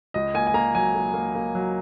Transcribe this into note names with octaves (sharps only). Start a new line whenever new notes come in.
C#2 D#5
A#3 G#5
G#5
A#3 A#5
F#3 G#5
A#3
A#3
A#3
F#3